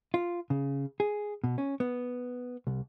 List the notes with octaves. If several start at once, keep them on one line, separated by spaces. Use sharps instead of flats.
F4
C#3
G#4
B2
C#4
B3
C2